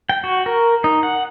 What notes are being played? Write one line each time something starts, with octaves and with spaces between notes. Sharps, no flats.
G5
F#4
A#4
D#4
F#5